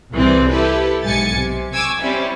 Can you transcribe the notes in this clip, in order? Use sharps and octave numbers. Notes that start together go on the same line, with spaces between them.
C2 E3 C4 G#4 D5
E4 G4 A4 B4
B1 G#2 G#5 A6 C#7
C3
G#5 C#6 D6 E6 G#6
G3 C4 C#4 E4